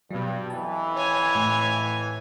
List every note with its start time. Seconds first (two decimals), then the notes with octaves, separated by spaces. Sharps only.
0.11 G2 B2 F#3
0.50 F2 E3 A5
0.96 C#5 G#5
1.35 A2